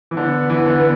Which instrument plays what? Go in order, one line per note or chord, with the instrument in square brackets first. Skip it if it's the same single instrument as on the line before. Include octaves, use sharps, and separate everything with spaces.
[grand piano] E3
[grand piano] D3 [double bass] B3
[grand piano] E3
D3